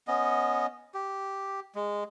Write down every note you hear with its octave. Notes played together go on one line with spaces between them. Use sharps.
B3 C#4 D#5
G4
G#3